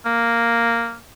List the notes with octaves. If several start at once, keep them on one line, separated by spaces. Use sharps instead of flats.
A#3